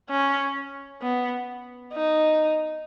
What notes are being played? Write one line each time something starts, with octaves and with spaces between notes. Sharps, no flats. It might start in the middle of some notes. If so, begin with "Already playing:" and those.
C#4
B3
D#4